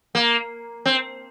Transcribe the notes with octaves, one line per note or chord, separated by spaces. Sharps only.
A#3
C4